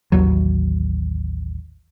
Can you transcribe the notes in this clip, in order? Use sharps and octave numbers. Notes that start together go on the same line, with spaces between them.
A1 D#2 G#2 F#3